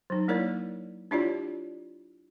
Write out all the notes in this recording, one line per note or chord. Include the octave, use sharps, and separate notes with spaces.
F#3 D#4
A#3 E4 A#4 C#5 D5
D4 E4 F4 G4 C#5 D5